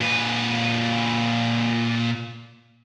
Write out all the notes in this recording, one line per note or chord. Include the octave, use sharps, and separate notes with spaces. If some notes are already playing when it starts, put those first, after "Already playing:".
A#2 B4